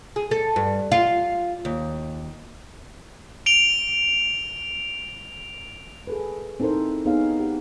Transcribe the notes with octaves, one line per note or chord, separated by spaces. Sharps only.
G#4
A4
G2
F4
D#2
D7 F7 G7
G#4 A4 B4
C4 D#4 E4 A4 A#4 C5
B3 D#4 G#4 C#5 F5
G4 F#5